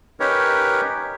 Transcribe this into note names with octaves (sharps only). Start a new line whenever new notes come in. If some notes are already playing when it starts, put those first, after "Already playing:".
C#4 D#4 G4 A#4 B4 C#5